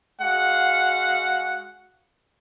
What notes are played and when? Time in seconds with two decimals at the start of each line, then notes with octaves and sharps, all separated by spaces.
0.22 G#3 F#4 F5 F#5